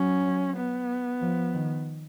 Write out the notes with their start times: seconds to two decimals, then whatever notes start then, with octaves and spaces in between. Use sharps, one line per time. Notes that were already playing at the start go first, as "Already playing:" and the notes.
Already playing: F#3 C#4
0.57 B3
1.22 F3
1.54 D#3